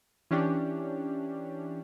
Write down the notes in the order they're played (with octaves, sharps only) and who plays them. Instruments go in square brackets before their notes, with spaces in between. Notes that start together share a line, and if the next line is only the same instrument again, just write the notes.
[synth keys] E3 C#4 D4 G4